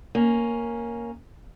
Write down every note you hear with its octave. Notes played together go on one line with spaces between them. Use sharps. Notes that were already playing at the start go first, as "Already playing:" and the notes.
A#3 C#4